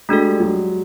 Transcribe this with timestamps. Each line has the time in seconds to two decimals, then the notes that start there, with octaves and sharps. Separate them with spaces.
0.09 G#3 A3 D4 F#4 A4
0.25 G3
0.40 F#3